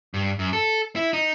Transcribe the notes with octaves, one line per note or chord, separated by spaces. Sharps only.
G2
F#2
A4
E4
D#4